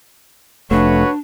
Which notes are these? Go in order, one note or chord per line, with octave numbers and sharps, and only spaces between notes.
F1 A3 D4 F#4 B4 C#5